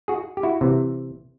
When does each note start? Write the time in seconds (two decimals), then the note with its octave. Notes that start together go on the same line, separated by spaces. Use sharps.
0.08 F#4 G#4
0.37 G4
0.43 E4 F#4
0.61 C3 E3